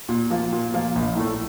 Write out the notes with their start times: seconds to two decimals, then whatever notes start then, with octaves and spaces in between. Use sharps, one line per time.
0.09 A#2
0.30 F3 A#3 F4
0.53 A#2
0.74 F3 A#3 F4
0.95 A#1
1.16 A2 A3